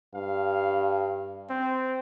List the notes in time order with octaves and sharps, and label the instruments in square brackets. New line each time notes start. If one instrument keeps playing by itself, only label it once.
[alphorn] G2 [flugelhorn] F5
[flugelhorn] C4